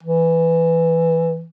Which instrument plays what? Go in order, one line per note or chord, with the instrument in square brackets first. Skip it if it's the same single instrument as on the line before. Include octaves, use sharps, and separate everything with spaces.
[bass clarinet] E3